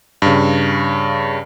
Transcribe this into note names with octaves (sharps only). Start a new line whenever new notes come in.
G2 C#3